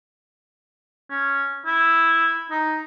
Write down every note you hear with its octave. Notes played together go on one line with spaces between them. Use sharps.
C#4
E4
D#4